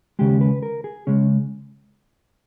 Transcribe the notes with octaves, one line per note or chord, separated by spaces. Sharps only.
D#2 C#3 G#3 G4
B4
A#4
G#4
C#3 G#3 C#4